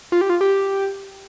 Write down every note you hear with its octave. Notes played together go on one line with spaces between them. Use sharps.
F4
G4
F4
G4